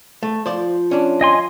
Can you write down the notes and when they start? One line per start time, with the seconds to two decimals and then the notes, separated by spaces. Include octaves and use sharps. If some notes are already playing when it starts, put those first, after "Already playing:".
0.23 A3
0.46 F3 C5 D5
0.91 C#4 D4
1.21 D#5 G#5 C6